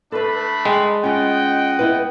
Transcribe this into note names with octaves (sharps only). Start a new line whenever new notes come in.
A3 D4 A4 B4 B5
G#3 G5
C#4 F4 D#5 F#5 G5
B3 E4 B4